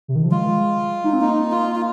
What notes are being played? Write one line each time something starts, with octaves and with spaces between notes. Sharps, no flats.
C3
D#3
F3
G#3 F4
D#4
C4
A#3 D#4
F4
F4